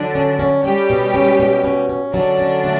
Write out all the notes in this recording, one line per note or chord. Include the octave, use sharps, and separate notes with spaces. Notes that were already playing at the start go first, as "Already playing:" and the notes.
Already playing: D3 F#3 D4
C#4
C#4
G3 C#4 G4
B2
C#4
B2
C#4
C#4
D3 F#3 D4
C#4
A3